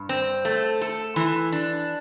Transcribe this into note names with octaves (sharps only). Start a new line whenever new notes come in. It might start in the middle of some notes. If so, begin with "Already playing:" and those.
Already playing: G2
C4
A3
A4
E3
D4